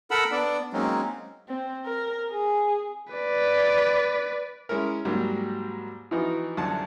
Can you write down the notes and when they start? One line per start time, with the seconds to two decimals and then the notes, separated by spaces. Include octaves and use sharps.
0.11 A4 A#4 F#5 B5 E6
0.32 B3 D4 D5
0.73 F#3 G#3 A#3 C4 C#4 D#4
1.48 C4
1.86 A#4
2.31 G#4
3.13 B4 D5
4.69 G#3 C#4 E4 A#4
5.05 G#2 F#3 G3 A#3
6.11 E3 F3 B3 D#4 F#4
6.57 C2 F#2 D3 A5